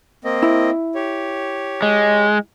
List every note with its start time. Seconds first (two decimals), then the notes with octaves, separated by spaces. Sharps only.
0.24 A#3 C4 D#5
0.42 E4
0.95 G4 C#5
1.82 G#3